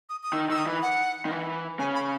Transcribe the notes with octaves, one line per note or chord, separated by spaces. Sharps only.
D#6
D#6
D#3 E6
D#3 E6
D#6
E3
F#5
D#3
E3
C#3 G#5
B5